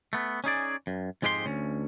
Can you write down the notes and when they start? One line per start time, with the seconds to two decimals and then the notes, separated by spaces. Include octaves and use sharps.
0.13 A3 B3
0.44 C#4 D#4 G#4 D5
0.87 F#2
1.22 F2 G#2 G#3 G4 A4 C6
1.46 D2 C#4